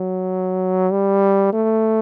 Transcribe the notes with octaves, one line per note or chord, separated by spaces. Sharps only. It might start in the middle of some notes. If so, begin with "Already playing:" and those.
Already playing: F#3
G3
A3